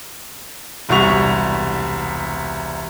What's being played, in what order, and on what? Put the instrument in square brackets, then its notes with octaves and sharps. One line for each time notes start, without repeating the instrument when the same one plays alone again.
[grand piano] E1 C2 G3 F#4 C#6 F7